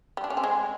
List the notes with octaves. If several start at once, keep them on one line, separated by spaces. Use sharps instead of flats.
G3
D4
C#4
C4
G#3